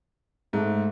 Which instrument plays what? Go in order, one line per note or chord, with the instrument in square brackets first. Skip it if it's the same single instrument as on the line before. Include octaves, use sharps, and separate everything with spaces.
[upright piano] G#2 [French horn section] A3